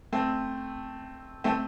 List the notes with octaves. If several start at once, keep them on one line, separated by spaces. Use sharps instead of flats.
A3 C4
A3 C4